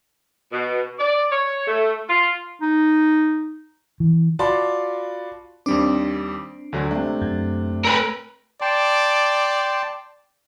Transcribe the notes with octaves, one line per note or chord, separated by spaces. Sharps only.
B2
D5
C#5
A3
F4
D#4
E3
F4 F#4 D5 A5 B5 C6
D#2 G3 C4 D4 D6
D2 D3 F#3
C3 A3 D4
F#2
A#4 B4 G5 G#5 E6
D5 G5 A5 C6